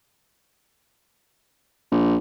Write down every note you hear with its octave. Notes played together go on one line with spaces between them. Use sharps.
A#1